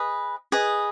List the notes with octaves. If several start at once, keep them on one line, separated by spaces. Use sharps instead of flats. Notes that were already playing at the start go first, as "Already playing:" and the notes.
Already playing: G#4 B4 D#5
G#4 B4 D#5